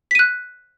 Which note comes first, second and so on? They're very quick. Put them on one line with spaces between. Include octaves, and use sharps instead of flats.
B6 D#7 F#6